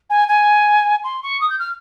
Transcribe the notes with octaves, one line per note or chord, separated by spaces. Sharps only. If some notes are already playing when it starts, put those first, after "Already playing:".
G#5
G#5
C6
C#6
D#6
G6
F6